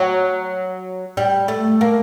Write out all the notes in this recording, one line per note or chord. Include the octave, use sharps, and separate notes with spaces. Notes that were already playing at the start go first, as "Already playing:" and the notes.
Already playing: F#3
G3
A3
A#3